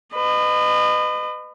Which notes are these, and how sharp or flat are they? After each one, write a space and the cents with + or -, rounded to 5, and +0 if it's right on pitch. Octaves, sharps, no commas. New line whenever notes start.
B4 +25 D#5 -30